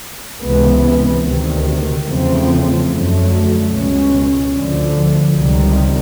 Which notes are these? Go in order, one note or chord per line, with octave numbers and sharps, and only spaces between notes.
C#2 C3 E3 G#3 B3
D2 C3 D#3
E2 C#3 F3 A3 C4
F#2 D3 F#3 A3
C#2 B2 G#3 C#4
D2 D3 F3
C#2 C3 D#3 G3